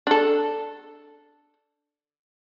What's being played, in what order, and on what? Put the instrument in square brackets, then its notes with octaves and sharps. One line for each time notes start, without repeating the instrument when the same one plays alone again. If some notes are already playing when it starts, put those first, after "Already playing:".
[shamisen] D4 A4